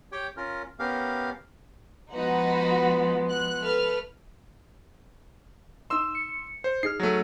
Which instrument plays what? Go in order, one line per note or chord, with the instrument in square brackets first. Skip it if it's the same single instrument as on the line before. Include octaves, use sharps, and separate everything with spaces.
[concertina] G4 C#5 G5
C#4 F4 A#4
B3 C#4 G4 A#4 F5
[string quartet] F3 G#3 B3 [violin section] D#4 F#4 B5
[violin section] F#6
A3 B4 F6
[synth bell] D#4 E7 [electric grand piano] C6 E6
[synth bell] C#7
[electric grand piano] C5
[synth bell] D#4 G#4 F6 [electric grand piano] C7
[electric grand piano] F#3 A3